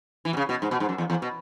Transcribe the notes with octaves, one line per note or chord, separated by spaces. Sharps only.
E3
B2
C#3
B2
G#2
B2
G#2
F#2
E2
E2
B2